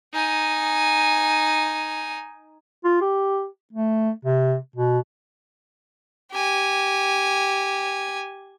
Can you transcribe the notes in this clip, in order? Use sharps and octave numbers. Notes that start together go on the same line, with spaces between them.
D#4 G#5
F4
G4
A3
C3
B2
G4 G#5